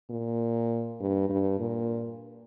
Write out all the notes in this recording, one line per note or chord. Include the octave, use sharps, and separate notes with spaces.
A#2
G2
G2
A#2